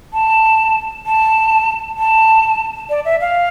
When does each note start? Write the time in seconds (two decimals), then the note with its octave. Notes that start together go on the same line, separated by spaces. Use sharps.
0.13 A5
1.06 A5
1.98 A5
2.90 D5
3.05 E5
3.21 F5